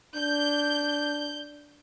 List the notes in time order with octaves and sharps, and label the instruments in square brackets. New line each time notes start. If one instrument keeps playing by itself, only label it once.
[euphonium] D4 [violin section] G6